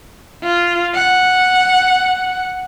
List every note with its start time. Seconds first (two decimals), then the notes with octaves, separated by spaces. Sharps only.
0.43 F4
0.94 F#5